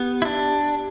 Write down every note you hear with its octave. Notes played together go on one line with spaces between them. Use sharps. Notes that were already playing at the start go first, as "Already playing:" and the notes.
Already playing: B3 G4
E4
D4